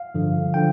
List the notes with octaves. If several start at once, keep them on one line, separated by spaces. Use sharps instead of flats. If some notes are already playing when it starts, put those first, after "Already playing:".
Already playing: F5
G2 D3 F3
D3 F3 G5